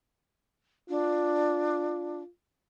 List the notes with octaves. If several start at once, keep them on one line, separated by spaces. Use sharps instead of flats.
D4 F4